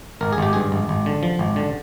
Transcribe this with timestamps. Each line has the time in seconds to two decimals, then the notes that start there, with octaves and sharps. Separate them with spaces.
0.21 G#1 A#4
0.33 G#4
0.38 G#1 G4
0.53 G2 G#4
0.72 G#1
0.89 G#1
1.06 D3
1.23 F3
1.39 G#1
1.56 D3